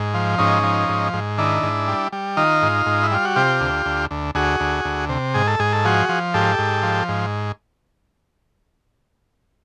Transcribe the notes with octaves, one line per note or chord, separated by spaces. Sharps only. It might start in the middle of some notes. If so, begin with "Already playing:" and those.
Already playing: G#2
F3
G#2 C#4 D#4
F3
G#2
G#2
D#3 D4 E4
G#2
G3
G3
D#3 D#4 F4
G#2
G#2
E4
G3 F4
F#4
C3 F4 G4
D2
D2
D2
D2 F#4 G#4
D2
D2
C3
G#2 G#4
A4
G#2 G#4
A4
F3 F#4 G#4
F3
G#2 G4 A4
G#2
F3
G#2